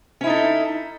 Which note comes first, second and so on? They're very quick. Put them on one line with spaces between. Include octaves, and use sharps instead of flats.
C#4 E4 D#4 A4